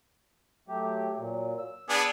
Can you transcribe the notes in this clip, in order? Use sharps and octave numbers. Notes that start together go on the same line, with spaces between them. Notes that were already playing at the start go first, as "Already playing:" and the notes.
F#3 A3 G4
A#2 F#3
E6
B3 D4 G#4